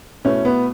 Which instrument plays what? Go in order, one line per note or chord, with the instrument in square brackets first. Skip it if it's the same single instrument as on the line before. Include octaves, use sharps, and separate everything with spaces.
[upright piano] B2 A3 E4 B4 [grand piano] C#4
[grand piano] B3